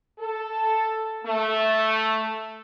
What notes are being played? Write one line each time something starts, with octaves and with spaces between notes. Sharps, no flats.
A4
A3